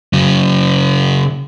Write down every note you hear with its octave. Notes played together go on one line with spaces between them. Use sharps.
C#3 F#3